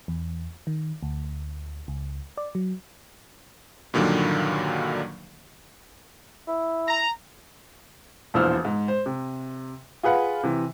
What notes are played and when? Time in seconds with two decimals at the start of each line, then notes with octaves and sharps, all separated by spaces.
0.08 E2
0.67 D#3
1.03 D2
1.88 C#2
2.37 D5
2.55 F#3
3.94 G2 A#2 D3 D#3 F#3 A#3
6.47 E4
6.88 A#5
8.34 E1 A#1 E3 C5 E6 F6
8.65 G#2
8.88 C5
9.06 C3
10.03 F4 G#4 B4 F#5
10.43 C3 E3